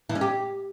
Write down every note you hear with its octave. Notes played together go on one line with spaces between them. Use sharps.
E3
C#4
G4